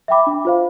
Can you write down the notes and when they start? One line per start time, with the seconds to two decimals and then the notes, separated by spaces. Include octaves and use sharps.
0.08 E5 G5 B5 D6
0.27 D4
0.45 F4 C5 F5